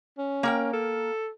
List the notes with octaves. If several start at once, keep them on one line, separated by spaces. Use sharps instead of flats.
C#4
A#3 A#4 G5
A4